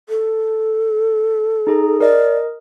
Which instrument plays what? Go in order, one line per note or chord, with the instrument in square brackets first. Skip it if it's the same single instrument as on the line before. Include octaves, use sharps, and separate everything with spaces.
[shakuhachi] A4
[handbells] D#4 G#4 A#5
[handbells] A#4 D#5 [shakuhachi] D5